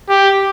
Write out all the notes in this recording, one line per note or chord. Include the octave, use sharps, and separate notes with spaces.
G4